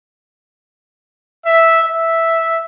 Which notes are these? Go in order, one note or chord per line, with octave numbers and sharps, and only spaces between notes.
E5
E5